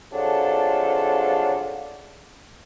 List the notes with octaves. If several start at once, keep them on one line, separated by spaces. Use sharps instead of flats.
C3 F#3 D4 F4 G#4 A4